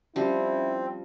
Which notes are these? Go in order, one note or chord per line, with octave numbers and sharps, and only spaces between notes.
F3 G3 C4 C#4 E4